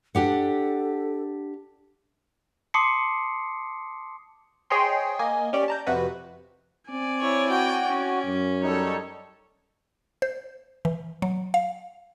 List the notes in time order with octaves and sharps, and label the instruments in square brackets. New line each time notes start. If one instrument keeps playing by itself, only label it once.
[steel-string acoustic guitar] D4 G4 F#5 [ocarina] A4
[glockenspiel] A5 C6 D6 D#6 C7 C#7
[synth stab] G#4 C5 C#5 D#5 G5 C6
A#3 D#5 G#5
C#4 G4 D5
A5 A#5 G6
F2 C3 F#4 B4
[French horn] C4 [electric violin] D5 G#5
[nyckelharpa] E4 C#5
[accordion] F#4 [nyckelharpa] G5
[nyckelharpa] C#4
[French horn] F#2
[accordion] G3 D#4 [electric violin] A4 C#5
[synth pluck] C5
E3
F#3
F5